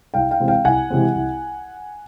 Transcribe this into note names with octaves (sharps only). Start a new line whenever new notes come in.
C2 F5 G5
F5 G5
C3 E3 G#3 C4
F5 G5
C2 F#5 G#5
C3 E3 G#3 C4
C2